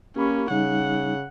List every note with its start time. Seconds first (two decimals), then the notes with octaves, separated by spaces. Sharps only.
0.17 A#3 C#4 G4 B5 C#6
0.51 C#3 G3 D#4 F#5